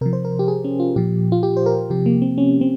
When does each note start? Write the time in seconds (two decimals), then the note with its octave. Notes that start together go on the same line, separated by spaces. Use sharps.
0.01 C3 F3 A#4
0.13 C5
0.25 A#4
0.39 G4
0.48 G#4
0.64 C#4
0.80 F4
0.96 A#2 F3 G4
1.32 F4
1.43 G4
1.57 C5
1.66 A#4
1.90 C3 F3 G4
2.06 A#3
2.22 C4
2.38 C#4
2.61 C4